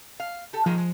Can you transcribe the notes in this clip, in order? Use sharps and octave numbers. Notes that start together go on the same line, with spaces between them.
F5
G4 A4
D#3 F3 G#3 A#3
G#3